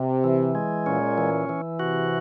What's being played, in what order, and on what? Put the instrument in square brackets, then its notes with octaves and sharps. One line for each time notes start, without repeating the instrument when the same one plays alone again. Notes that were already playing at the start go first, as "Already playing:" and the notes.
Already playing: [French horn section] C3
[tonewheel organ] E3
G#3
[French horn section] A#2 [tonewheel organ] C#4
[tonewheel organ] E3
E3
[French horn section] C3 [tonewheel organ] F#4